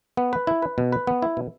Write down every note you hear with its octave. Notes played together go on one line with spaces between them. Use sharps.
B3
B4
E4
B4
B2
B4
B3
E4
B2